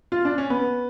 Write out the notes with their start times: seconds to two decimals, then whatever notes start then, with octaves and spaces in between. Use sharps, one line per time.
0.12 F4
0.25 D4
0.38 C#4
0.50 B3